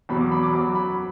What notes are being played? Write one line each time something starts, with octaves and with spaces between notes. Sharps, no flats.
E2 B2 F#3 B5
D6
B5
D6
F#2 F#3 D6
B5